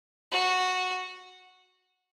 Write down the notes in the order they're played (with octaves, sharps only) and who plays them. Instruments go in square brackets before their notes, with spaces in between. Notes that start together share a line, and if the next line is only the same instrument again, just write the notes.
[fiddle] F#4